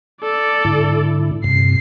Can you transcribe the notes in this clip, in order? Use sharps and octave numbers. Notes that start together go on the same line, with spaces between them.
A4 D5
G#2 D3 E4
G2 C3 C7